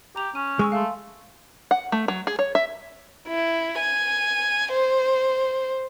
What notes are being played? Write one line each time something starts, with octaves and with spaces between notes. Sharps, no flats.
G4 A#5 F7
C#4 D#7
G#3 G#5 C#6 E6
A3 F5 C6
F#5
A3
F#3
G#4
C#5
E5
E4
G#5
C5